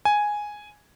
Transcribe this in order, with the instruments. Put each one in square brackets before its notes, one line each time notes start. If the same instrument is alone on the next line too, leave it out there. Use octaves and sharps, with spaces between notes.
[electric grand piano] G#5